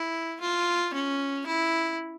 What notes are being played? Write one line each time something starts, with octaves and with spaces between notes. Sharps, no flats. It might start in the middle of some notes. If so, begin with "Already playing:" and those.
Already playing: E4
F4
C#4
E4